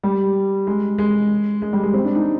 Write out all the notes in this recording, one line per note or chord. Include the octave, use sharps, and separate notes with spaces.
G3
G#3
G#3
G#3
G3
G#3
C4
D4
D#4